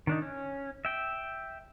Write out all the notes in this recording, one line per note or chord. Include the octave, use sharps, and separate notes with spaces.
D#3 D4 D#4
C#4
E5 G5